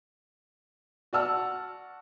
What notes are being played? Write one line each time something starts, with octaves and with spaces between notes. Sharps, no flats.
F#4 D5 F#5 A5 E6 F6